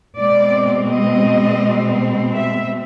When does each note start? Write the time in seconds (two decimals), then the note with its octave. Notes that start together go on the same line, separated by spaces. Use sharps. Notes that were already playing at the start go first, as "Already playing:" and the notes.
0.17 B2 G#3 C4 D5
0.91 D#5
2.36 E5